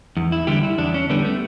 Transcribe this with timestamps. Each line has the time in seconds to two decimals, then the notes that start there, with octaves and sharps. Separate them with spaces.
0.17 E2
0.32 E4
0.47 D3 G3 G4
0.63 E4
0.78 E2 D4
0.94 C#4
1.10 D3 G3 B3
1.25 A3